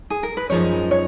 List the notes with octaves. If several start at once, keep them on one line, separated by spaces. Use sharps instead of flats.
G#4
A#4
B4
F#2 F3 G#3 D#4 C#5
C#5